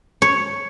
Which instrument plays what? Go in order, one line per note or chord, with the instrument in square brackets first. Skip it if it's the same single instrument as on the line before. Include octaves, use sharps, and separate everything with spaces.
[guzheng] C#5